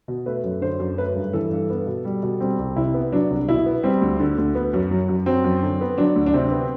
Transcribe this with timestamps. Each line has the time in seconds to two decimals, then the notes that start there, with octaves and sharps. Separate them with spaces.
0.08 B2
0.26 A3 B4
0.44 F#2
0.62 D3 C5
0.80 F#2
0.98 A3 B4
1.15 G2
1.33 E3 A4
1.51 G2
1.70 B3
1.87 B2
2.05 G3
2.23 B2
2.40 G3 C4
2.58 C2
2.76 C3 E4
2.94 B3
3.12 F#3 D4
3.31 C2
3.49 B2 E4
3.66 B3
3.83 G3 C4
4.02 D2
4.20 D3
4.38 D2
4.55 B3
4.73 F#2
4.91 F#3
5.08 F#2
5.26 F#3 C4
5.44 F#2
5.63 D3
5.81 B3
5.98 F#3 D4
6.16 D2
6.26 D4
6.34 C3 C4
6.51 B3